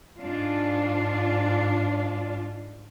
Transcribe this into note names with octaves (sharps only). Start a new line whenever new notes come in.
G#2 D4 F4